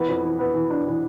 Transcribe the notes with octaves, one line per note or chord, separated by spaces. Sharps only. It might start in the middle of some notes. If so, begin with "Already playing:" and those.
Already playing: E3 B3
F2
E3
B3
E3
D4
E3